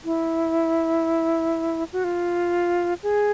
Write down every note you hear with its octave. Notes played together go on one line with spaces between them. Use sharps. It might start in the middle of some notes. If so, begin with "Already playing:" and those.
E4
F#4
F4
G#4